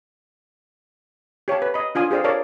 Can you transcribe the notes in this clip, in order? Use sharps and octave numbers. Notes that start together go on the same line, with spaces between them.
G4 C#5 F5 A5
B4
D#5 B5
D4 F4 G#5 D#6
G4 G#4 C5 D5 F5
A#4 C#5 D5 F5 A5